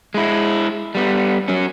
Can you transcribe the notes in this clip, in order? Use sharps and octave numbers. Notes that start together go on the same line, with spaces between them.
G#3 E4
G3 B3
F#3 C#4